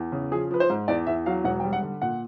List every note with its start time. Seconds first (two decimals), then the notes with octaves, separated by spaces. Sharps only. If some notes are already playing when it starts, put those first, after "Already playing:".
Already playing: E2
0.12 C#3
0.32 F3 G#4
0.51 F3 B4
0.60 C5
0.70 G#2
0.88 E2 D5
1.07 E2 E5
1.26 F#3 F5
1.44 E1 F#5
1.60 G5
1.64 G3
1.73 F#5
1.82 D3
2.02 A#2 F#5